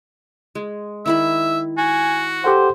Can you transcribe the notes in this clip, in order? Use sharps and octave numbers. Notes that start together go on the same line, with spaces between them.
G#3
D#3 E4 E5 B5
F#4 G#5
G4 A4 C5 F#5